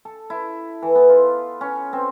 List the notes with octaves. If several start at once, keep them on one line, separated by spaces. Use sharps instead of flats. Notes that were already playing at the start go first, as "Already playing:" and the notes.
A4
E4
E3
B3
F4
C#4
C4